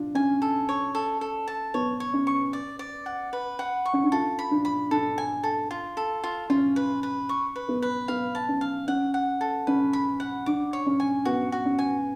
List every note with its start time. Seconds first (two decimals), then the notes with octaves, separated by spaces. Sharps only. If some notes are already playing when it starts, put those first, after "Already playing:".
Already playing: D4 F4
0.15 C#4 G#5
0.42 A4
0.69 C#5
0.95 A4
1.21 A4
1.48 A5
1.74 B3 C#5
2.00 C#5
2.13 C#4
2.27 C#6
2.53 D5
2.79 D5
3.06 F#5
3.33 B4
3.59 F#5
3.85 C#6
3.93 C#4
4.03 D4
4.12 F4 A4
4.39 B5
4.51 D4
4.65 B5
4.91 D4 A4
5.18 G#5
5.43 A4
5.71 F4
5.97 A4
6.24 F4
6.50 C#4 F4
6.76 B4
7.03 B4
7.29 C#6
7.56 B4
7.69 B3
7.82 B4
8.08 B3 F5
8.35 A5
8.49 C#4
8.61 F5
8.88 C#4 F#5
9.14 F#5
9.41 A4
9.67 C#4 B4
9.93 B5
10.20 F#5
10.46 D4 D6
10.73 C#5
10.86 C#4
11.00 G#5
11.25 B3 F#4
11.52 F#4
11.65 C#4
11.79 G#5